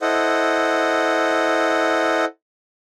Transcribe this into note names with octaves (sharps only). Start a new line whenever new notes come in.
E4 A4 C5 D#5 F#5